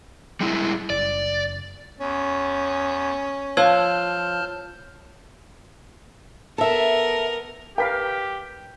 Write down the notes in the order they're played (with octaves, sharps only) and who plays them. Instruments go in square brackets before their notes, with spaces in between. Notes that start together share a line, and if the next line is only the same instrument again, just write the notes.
[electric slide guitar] G3 G#3 E4
[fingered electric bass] F#1 [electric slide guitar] D5
[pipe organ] E2 [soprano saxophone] C#4
[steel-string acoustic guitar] F3 [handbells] C#5 E6 G#6 [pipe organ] A5 F6 G6
[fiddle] B3 A#4 [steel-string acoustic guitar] A4 E5
[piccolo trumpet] G4 [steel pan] A#4 B4 F5 [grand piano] G5 B6